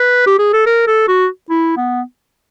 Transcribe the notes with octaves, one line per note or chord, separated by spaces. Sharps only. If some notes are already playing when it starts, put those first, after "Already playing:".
Already playing: B4
G4
G#4
A4
A#4
A4
F#4
E4
B3